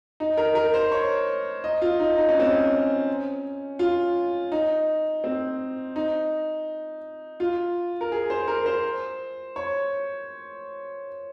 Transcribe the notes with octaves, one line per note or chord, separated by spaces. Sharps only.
D#4
A#4
A#4
C5
C#5
D#5
F4
D#4
D#4
C#4
C4
C#4
F4
D#4
C4
D#4
F4
A#4
G#4
C5
A#4
C5
C#5